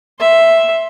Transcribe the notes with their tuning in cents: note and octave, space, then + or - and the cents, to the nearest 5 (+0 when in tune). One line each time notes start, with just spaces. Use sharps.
E5 +0 C6 +10